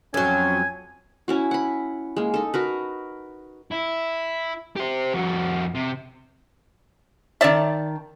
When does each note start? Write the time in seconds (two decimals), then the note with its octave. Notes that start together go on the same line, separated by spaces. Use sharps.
0.14 F2 F#3 C#4 G#5
1.28 C#4 E4 F#4
1.51 F#5 B5
2.17 G#3 A#3
2.34 D#4 A4
2.54 F#4 A#4 B4
3.71 E4
4.76 G4 C5
5.14 F2 F#4
5.75 C3
7.41 D#3 D5 E5 A5